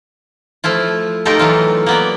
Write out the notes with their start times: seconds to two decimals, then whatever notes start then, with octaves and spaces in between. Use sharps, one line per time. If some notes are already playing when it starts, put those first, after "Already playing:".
0.64 F3 A3 E4 F4
1.25 A3 D#4 F4 G4 A4 A#4
1.39 E3 F#3 F4
1.86 A#3 B3 D5